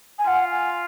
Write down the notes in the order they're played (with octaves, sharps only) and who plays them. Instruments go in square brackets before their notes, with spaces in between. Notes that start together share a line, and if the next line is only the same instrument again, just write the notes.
[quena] G#5
[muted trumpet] F4 [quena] F#5
[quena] G#5